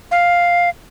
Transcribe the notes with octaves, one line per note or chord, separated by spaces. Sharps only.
F5